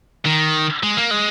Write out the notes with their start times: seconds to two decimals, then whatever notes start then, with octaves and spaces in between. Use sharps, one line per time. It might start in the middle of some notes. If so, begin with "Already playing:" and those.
0.25 D#3
0.83 G#3
0.97 A#3
1.11 G#3